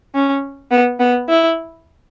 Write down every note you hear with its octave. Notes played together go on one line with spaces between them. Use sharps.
C#4
B3
B3
E4